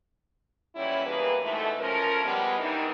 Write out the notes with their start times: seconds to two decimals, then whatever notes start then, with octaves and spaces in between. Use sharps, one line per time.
0.75 A#2 E3 F#3 G3 C#4 E4
1.05 B2 E3 G3 A#3 G#4 B4
1.43 G#2 B2 E3 G#3 A3
1.80 F3 C#4 A#4
2.24 G3 G#3 B3
2.59 C3 E3 G3 D4 D#4 A#4